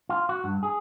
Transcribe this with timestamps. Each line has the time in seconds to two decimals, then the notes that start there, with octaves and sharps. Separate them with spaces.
0.09 F4
0.29 F#4
0.44 G2
0.63 G#4